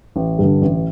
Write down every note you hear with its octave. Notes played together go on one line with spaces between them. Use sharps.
A1
G2 D3
A1